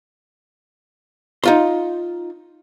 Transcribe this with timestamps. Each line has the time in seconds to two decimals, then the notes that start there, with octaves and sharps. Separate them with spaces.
1.44 D#4 F4 C6